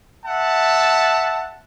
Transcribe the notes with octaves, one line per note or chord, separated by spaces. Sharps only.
E5 F#5 A5